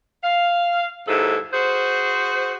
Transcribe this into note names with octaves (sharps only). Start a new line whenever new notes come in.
F5
D#2 G#2 E4 A4
F#4 G#4 C5